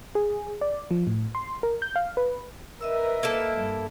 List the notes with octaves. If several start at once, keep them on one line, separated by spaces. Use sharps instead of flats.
G#4
D5
F3
A2
C6
A#4
G6
F5
B4
A#4 B4 D#5 E5 E6
A#3 E4 A4
G2